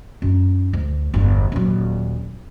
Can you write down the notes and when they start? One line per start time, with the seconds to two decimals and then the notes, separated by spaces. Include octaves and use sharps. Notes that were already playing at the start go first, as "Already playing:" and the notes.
0.22 F#2 D#4
0.73 D2
1.14 G1 E2
1.52 D#1 F#3